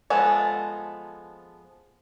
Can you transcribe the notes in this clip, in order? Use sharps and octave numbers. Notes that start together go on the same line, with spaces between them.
F3 G#3 B3 A4